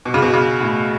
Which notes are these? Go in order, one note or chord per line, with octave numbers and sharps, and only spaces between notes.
B2
C#3
B2
C#3
A2